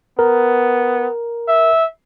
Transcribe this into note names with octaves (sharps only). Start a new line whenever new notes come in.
B3 A#4
E5